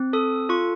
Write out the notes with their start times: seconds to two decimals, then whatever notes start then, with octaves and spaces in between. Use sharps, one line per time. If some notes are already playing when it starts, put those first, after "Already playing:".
Already playing: C4
0.13 A4 D#6
0.49 F4 C#6